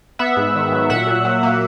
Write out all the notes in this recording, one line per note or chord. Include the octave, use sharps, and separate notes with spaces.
B3 E5 F#5
G#2
D#3
F#3
A#2 E5 F#5
A#2
F#3
A#3